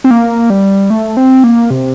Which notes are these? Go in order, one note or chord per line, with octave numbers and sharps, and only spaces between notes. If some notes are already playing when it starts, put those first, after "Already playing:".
C4
A#3
G3
A3
C4
A#3
C3